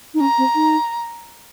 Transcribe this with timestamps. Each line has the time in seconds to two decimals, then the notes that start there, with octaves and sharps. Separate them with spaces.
0.14 D#4
0.21 C#4 A#5
0.38 C4
0.55 D#4